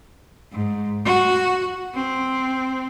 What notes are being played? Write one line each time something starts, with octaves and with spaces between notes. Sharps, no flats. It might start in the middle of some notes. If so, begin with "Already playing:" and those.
G#2
F#4
C4